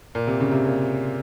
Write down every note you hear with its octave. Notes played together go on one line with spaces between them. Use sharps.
A#2
C3
C#3
C3
A#2